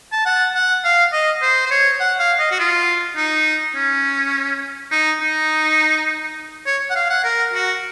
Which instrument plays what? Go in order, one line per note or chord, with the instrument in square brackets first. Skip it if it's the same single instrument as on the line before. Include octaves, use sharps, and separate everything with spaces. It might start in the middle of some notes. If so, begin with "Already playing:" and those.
[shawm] A5
F#5
F#5
F5
D#5
C5
C5
C#5
F#5
F5
D#5
F#4
F4
D#4
C#4
D#4
D#4
C#5
F#5
F5
F#5
A#4
F#4